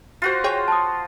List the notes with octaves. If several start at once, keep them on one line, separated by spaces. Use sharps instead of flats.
F4 F#4 C5 C6
G#4 C#5 G5
A5 D#6